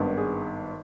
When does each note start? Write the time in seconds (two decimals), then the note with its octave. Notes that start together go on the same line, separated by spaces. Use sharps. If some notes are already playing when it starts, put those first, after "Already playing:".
Already playing: G#1 G2 D#3 B3 D4
0.17 G#4